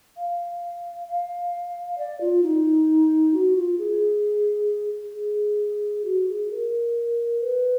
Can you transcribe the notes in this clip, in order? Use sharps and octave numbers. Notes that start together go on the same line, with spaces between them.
F5
F5
D5
F4
D#4
F#4
F4
G#4
G#4
F#4
G#4
A#4
B4